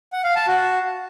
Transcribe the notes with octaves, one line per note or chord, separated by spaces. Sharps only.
F#5
F5
A5
F#4